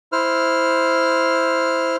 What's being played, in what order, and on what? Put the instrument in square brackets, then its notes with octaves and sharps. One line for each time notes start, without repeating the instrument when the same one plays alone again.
[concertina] E4 C5 F6